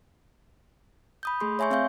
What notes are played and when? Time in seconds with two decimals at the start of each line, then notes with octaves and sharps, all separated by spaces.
1.23 B5 D#6 G6
1.41 A3 G#4 C6
1.59 C#5 E5 G#5 C6 C#6 G6
1.71 C4 E5 F5 C#6 G6